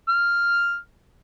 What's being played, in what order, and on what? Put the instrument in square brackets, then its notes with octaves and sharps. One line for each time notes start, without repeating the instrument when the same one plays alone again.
[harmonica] F6